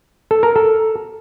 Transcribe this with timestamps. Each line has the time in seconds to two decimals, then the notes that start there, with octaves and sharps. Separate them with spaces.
0.31 A4
0.43 A#4
0.56 A4